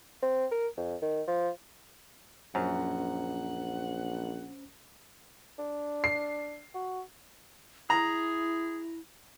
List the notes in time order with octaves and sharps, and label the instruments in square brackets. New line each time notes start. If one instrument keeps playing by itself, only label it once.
[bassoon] C4
A#4
F2
D#3
F3
[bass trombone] A#1 [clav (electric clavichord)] F#2 [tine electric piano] C#4 C5 A#5 [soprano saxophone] F#5
[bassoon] D4
[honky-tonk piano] C7
[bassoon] F#4
[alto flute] E4 [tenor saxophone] G#4 [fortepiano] A#5